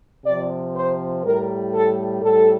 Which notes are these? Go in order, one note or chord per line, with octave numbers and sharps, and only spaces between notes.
C3 F3 D5
C5
A2 G3 A#4
A4
A2 G3 A4